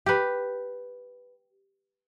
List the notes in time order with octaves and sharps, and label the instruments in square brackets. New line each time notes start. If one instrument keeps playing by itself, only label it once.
[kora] G4 B4